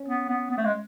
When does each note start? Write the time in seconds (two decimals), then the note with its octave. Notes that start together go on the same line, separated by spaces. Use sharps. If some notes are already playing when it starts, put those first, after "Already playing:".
Already playing: C#4
0.08 B3
0.29 B3
0.51 B3
0.58 A3
0.65 G#3